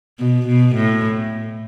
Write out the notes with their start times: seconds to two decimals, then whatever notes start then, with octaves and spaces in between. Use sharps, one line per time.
0.19 B2
0.48 B2
0.75 A2